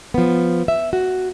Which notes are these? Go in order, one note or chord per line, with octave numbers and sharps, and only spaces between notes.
F3 B3
E5
F#4